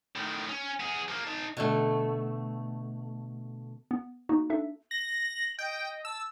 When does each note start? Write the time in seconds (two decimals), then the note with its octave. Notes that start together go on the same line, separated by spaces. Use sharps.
0.16 A2 D#3
0.49 C#4
0.80 B3 G#4
1.09 F3 A#3
1.24 D#4 A5
1.57 B2 D3 A3
3.91 B3
4.29 A#3 B3 D#4 F#4
4.50 D4 D#4 A4 E5
4.91 A#6 F#7
5.59 D#5 G5
6.05 A5 E6